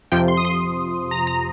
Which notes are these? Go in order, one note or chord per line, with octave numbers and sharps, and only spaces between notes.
F2 C3 F3 G5
C6
D#6
C6
A#5
A#5